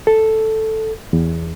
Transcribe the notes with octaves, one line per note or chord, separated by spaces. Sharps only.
A4
E2